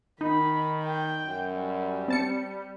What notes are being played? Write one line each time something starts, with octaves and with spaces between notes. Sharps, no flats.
D#3 D#4 B5
G5
F#2
G3
C4 A5 C#7